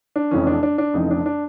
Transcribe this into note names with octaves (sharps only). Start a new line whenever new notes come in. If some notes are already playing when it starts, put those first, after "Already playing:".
D4
F1 F2 C#3 E3 C#4
D4
D4
D4
F1 F2 C#3 E3 D#4
D4
D4